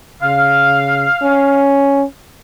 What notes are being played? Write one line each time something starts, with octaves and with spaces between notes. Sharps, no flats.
C#3 F5
C#4